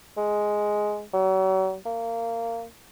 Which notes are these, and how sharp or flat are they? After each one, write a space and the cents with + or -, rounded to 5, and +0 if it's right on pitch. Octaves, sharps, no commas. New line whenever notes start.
G#3 +5
F#3 +40
A#3 -20